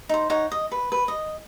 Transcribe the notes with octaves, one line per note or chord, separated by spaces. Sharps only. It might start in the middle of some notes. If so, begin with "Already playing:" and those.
D#4 C5
D#4 C#5 F#5
D#5
B4
B4
D#5